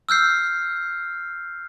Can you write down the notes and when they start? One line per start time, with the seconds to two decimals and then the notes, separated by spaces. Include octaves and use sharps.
0.09 E6 F6 G6 C7